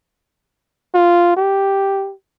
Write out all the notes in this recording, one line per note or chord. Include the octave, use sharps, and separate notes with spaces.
F4
G4